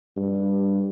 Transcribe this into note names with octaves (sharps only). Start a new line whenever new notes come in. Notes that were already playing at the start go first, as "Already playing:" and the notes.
G2